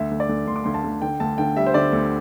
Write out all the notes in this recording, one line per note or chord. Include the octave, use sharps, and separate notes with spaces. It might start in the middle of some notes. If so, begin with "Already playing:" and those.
Already playing: D2 E5
D2
D5
D2
D2 C6
D6
D2 C6
A5
D2
D3 G5
D2 A5
D3 G5
G3 E5
C5
D3 D5
D2